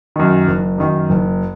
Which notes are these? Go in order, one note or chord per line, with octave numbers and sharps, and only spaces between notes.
F#2 D#3
F#1
F#2 D#3
F#1